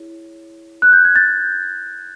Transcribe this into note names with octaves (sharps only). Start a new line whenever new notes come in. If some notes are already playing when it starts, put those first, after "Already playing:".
Already playing: E4 G#4 C#5
F#6
G6
G#6
G6 A6